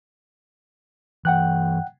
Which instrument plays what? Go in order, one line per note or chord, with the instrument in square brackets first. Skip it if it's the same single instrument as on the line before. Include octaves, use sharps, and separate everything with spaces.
[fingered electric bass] G2 E3 [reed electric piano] F#5 G5 F#6